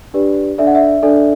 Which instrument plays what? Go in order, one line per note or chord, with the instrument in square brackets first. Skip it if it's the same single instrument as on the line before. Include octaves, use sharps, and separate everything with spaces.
[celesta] D4 G4 B4 D5
D4 A4 D5 E5
F#5
E5
D4 A4 D5